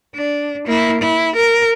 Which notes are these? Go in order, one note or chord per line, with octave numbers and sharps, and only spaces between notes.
D4
A#3 E4
E4
A#4